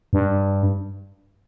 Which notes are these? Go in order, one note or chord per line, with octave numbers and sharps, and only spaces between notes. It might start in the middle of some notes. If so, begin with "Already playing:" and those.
G2